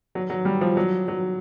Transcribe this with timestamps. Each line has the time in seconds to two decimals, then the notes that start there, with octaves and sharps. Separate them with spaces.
0.15 F#3
0.30 F#3
0.45 G3
0.61 F3
0.77 F#3
1.08 F#3